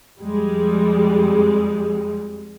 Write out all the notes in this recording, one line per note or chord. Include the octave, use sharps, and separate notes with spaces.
F2 G3 G#3